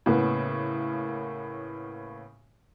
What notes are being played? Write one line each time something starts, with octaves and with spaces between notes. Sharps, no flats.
A2 C#3 A#3 B3